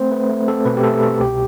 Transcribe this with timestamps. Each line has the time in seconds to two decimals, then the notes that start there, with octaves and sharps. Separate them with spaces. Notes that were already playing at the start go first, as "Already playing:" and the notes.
Already playing: A3 C4 C5
0.12 A3 B4
0.29 A3
0.48 C4 A4
0.65 B2 B4
0.77 G4
0.84 A3 A4
1.03 B2 A4
1.20 C2 G4